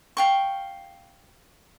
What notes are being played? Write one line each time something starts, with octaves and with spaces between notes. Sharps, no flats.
F5 G5 C#6